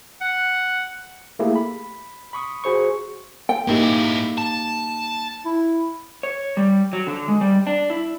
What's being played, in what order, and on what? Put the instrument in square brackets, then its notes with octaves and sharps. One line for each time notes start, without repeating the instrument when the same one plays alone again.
[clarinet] F#5
[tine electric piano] A3 A#3 E4 G4 G#4
B5
B5 C#6 D#6
F#4 G#4 C5 C#6
[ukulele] G5
[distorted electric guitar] G#2 E4 [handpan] A#3 D#4 G4
[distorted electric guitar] A5
[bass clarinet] E4
[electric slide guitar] C#5
G3
F#3
D3
G#3
G3
D4
E4